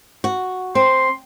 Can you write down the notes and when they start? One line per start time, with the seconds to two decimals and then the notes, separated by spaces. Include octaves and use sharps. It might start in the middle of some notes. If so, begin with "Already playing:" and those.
0.24 F#4
0.75 C4 C6